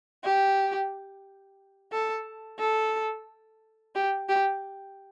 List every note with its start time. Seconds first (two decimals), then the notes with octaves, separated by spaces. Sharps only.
0.24 G4
1.92 A4
2.60 A4
3.95 G4
4.29 G4